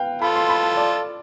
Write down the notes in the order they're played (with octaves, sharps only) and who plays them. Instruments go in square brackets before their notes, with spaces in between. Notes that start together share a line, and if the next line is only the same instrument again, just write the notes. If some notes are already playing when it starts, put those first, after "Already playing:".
Already playing: [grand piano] B4 F5 G5
[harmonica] F4 A4 [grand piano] B5
[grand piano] C6
B5
A5
D5